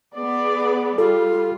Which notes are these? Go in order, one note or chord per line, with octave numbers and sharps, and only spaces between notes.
B3 G#4 D5
G3 F4 A4